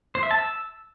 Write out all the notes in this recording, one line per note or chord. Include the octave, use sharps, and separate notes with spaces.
C5
E5
A5
E6